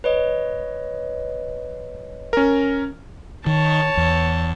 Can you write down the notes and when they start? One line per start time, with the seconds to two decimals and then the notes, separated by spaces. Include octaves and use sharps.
0.04 B4 C#5 D#5
2.33 C#4 A#4
3.46 D#3 C#5 A5
3.97 E2